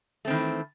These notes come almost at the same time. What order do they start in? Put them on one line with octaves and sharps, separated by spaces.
A3 C4 D#3 E3